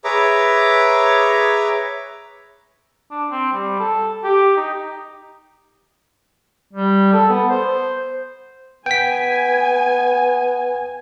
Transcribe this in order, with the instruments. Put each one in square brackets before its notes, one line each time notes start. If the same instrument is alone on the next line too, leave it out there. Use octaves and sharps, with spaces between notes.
[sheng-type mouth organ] G#4 B4 C#5 E5 A#5 D6
[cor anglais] D4
C4
G3
A4
G4
D#4
[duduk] G3
A4
B3
C5
[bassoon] B3 [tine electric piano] G5 B6 [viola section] G#5